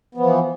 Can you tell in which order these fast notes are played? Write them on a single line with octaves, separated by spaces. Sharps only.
B3 F3 E3